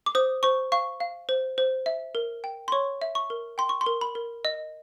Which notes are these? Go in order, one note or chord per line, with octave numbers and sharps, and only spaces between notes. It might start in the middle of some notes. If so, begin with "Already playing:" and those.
D6
C5 D#6
C5 C#6
F5 C#6
F5
C5
C5
E5
A#4
G5
C6
C#5 C#6
E5
C#6
A#4
G5 C6
C#6
C6
A#4
B5
A#4
D#5